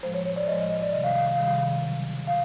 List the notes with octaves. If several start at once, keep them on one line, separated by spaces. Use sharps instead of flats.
A2 F3 G#3 C5
C#5
C#5
D5
A2 F3 G#3 D#5
D#5
D#5
D5
C3 D#3 G3 D#5
F5
F5
F5
C3 D#3 G3
C#3 F#3
F#3 F5